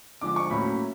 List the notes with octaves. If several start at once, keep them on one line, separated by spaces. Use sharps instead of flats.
D3 F3 G#3 C4 D6
C#6
A2 F#3 A#3 C#4 B5